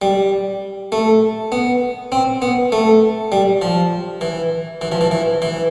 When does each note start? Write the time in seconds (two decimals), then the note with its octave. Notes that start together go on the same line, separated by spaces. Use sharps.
0.02 G3
0.92 A3
1.52 B3
2.12 C4
2.42 B3
2.72 A3
3.32 G3
3.62 F3
4.21 E3
4.81 E3
4.92 F3
5.01 E3
5.11 E3
5.42 E3